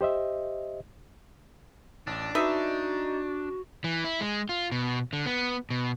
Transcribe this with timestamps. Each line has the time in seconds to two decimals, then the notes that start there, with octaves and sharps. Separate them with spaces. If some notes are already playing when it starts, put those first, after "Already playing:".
0.01 G4 C5 D#5 E5
2.07 A1 D4
2.35 D#4 F#4 B4 D#5 E5
3.84 E3
4.04 E4
4.21 G#3
4.49 F4
4.72 B2
5.13 D3
5.26 B3
5.70 B2